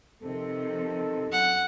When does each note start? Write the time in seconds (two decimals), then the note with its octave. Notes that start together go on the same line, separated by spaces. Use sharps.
0.22 C3 D#3 F3 A4
1.32 F#2 F#5